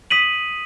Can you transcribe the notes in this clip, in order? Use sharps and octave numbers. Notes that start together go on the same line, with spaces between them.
D#6 B6 D#7 F#7